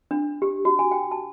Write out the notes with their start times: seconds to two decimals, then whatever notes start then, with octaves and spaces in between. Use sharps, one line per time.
0.11 D4
0.42 G4
0.65 F#4
0.79 G#5
0.91 G5
1.11 A5